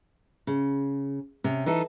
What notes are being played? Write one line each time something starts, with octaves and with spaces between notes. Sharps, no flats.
C#3
C3 C#4
E3 D#4 A4